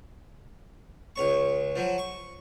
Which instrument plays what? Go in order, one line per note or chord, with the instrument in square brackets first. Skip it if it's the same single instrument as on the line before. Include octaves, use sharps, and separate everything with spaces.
[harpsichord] C#2 C#5 C#6
F3 F#3
C#6